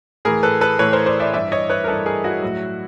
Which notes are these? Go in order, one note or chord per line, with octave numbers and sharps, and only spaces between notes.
A2 E3 G#4 A#4
A4 B4
A4 B4
A2 E3 B4 C#5
A#4 C5
C5 D5
D5 E5
G2 E3 D5 E5
C#5 D#5
B4 C#5
A#4
G2 E3 A4 B4
G#4 A#4
E4 F#4
A2 F#3